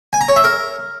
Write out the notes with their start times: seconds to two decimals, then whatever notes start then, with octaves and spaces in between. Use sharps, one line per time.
0.13 G#5
0.21 A#5
0.28 C#5
0.36 E5
0.44 A#4